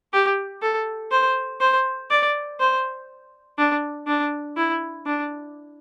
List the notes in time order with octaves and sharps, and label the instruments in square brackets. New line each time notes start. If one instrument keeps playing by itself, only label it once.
[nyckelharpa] G4
A4
C5
C5
D5
C5
D4
D4
E4
D4